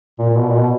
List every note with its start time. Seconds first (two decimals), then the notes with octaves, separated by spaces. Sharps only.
0.19 A#2
0.29 A#2
0.39 B2
0.49 A#2
0.59 B2